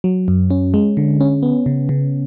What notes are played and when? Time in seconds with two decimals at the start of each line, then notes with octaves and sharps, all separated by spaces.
0.04 F#3
0.28 F#2
0.50 C#4
0.74 G#3
0.97 D3
1.21 C#4
1.43 B3
1.66 C#3
1.89 C#3